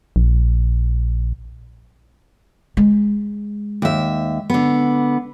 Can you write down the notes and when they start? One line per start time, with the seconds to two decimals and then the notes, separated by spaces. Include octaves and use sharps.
0.16 A#1
2.77 G#3
3.82 D#2 E5
4.50 D3 B3